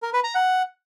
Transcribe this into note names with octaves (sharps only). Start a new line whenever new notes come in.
A#4
B4
A#5
F#5